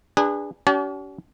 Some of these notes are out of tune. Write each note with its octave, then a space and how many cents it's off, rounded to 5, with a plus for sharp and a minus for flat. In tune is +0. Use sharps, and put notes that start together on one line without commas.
D4 +0 G#4 -30 B4 +0
C#4 +45 G4 -45 A5 -40